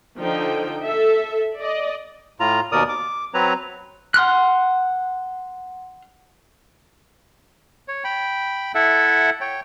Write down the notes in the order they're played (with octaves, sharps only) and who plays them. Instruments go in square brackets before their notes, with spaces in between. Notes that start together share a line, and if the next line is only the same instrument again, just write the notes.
[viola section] D3 F3 D#4 G5
A4 E5
D5 D#5
[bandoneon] A2 F4 A#5
D#2 B2 A#4 D5 D#6
D6
F#3 C4 B4 C#5 A#5
[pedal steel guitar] F#5 C6 F6 F#6
[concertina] C#5
G5 B5
E4 A4 E5 F#5
C#5 G5